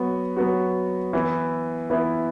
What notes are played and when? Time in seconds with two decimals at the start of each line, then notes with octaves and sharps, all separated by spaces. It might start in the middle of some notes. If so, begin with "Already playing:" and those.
Already playing: F#3 B3 F#4
0.36 F#3 B3 F#4
1.13 E3 B3 E4
1.90 E3 B3 E4